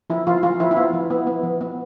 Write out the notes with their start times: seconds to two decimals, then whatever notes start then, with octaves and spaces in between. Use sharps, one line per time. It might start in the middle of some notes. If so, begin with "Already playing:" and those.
0.10 F3 E4
0.27 F3 F4
0.43 F3 F4
0.60 F3 E4
0.71 E4
0.76 B3 F4
0.93 F3
1.10 B3
1.27 B3
1.43 F3
1.61 B3